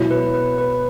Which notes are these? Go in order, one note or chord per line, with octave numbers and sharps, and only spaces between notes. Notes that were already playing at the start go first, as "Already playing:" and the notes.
Already playing: B2 F#3 B3 E4 C#5
B4
B4
B4